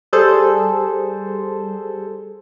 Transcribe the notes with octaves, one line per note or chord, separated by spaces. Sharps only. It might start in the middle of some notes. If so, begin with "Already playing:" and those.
G3 G#4 A4 C5